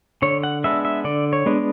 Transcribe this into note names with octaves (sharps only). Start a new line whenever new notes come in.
D3 C#5
F#5
G#3 B3 D4 E5
E5
D3 D5
C#5
G#3 B3 D4